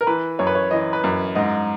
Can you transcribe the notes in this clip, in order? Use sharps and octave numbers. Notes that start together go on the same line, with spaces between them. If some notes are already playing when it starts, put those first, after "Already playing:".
A#4
E3 B4
F#2 C#5
B4
C#5
E3 D#5
B4
F#2
G#2 D#5